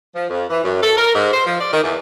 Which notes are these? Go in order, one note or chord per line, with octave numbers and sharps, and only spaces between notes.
F3
F2
E3
F#2
A4
A#4
G#2
C5
F3
D5
D#3
E2